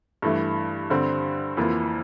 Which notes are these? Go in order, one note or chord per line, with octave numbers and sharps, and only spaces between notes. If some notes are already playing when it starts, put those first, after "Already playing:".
G2 E3 A3
G2 D3 G3 C4
F2 E3 A#3 F4